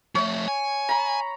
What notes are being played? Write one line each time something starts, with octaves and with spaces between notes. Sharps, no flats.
F3 A3 C#5
G#5
A#5 B5